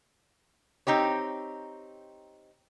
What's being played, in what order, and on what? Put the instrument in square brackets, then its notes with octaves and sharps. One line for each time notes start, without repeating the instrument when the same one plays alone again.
[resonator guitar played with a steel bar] C4 D#4 G4 C#5